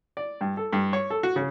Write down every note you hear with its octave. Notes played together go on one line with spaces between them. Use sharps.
D5
G2
A4
G2
C#5
A4
F#4
C#3